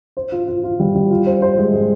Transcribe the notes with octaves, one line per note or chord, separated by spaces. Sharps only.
C5
F4
F4
F4
G3
G3
F4
C5
C5
G#3
G#3